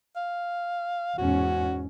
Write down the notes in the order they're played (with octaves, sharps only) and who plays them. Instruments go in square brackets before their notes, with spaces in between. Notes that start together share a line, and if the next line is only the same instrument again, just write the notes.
[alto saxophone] F5
[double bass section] E2 G#2 C#4 [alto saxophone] F#4